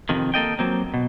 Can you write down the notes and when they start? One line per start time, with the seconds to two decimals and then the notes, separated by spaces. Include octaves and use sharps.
0.09 F2 C3 D#3
0.34 A#3 A4 D#5 G5
0.59 F#3 A#3 C4
0.94 B2